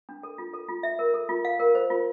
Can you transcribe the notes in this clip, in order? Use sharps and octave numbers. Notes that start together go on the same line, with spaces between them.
D4
A4
F4
A4
F4
E5
A#4
A4
F4
F5
A#4
C5
F4